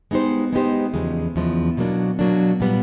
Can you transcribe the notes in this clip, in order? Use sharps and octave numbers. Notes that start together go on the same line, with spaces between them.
G#3 B3 D#4 G4 C5
G#3 B3 D#4 G4 C5
E2 C#3 F3 G#3
E2 C#3 F3 G#3
B2 F#3 A#3 D4
B2 F#3 A#3 D4
A#2 G3 B3